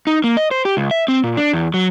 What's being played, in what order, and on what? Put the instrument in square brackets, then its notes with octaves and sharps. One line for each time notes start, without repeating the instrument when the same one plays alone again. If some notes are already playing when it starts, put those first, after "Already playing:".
[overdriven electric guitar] D#4
A#3
D#5
C5
G4
C#2
E5
C4
A#2
D4
E2
F#3